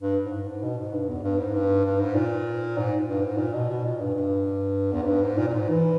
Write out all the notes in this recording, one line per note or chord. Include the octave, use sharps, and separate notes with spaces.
G2
G#2
G2
G#2
B2
G#2
G2
E2
G2
G#2
G2
G2
G#2
A#2
G#2
G2
G#2
A#2
B2
B2
A#2
G2
G2
E2
G#2
G2
G#2
A#2
A#2
G#2
E3